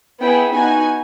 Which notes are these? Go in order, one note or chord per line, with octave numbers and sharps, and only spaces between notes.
B3 E4 G#4 G5
B3 D#4 F#4 G#5